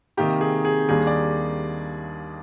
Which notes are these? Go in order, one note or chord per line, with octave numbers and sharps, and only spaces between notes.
C3 D#3 A#3 D#4 G4
G#4
G#4
D#2 D#3 G3 A#3 D4 G#4
D5